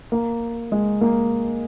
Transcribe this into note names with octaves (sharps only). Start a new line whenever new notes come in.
A#3
G#3
A#3